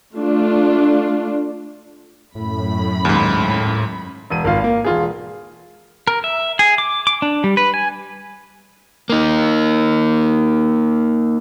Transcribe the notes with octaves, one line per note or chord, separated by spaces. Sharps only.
A3 D4 F4
F#2 A2 B5
D#2 G#2
E1 D#7
G#1 F4 F5
A#3 F5
E1 F4 G#4
A#4
E5
G#4
D6
D6
D4
G3
B4
G#5
A#3 D#4